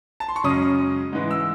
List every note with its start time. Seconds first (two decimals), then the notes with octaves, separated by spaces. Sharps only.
0.20 A5
0.28 C6
0.36 C#6
0.44 F#2 C#3 G#3 C#4 D#6
1.12 G#2 E3 G#3
1.31 E6